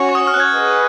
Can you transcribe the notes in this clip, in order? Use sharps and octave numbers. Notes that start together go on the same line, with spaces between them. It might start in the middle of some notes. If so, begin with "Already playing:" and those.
Already playing: C#4 F#4 C#5
C#6
D#6
F6
F#6
G#6
G#4 B4 D#5 F#5